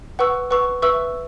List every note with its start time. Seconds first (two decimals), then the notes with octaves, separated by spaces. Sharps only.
0.19 B4 F#5 C#6 E6
0.51 B4 F#5 C#6 E6
0.82 B4 E5 C#6 E6